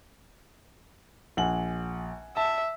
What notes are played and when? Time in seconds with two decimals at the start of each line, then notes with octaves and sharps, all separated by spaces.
1.37 A#1 F#5 G#5 F#7
2.37 E5 A5